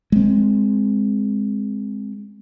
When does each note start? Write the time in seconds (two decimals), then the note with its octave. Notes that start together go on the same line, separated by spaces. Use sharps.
0.12 G#3 C4